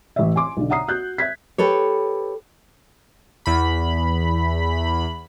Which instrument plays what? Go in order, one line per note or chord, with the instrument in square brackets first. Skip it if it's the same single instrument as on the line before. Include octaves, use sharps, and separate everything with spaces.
[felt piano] A1 E5
G#5 C6 D6
B1 D3
E5 F#5 A#5 D#6 C7
F#4 F#6 G6
E5 G#6 B6
[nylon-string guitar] G4 A4 B4 C#5
[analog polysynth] E2 B5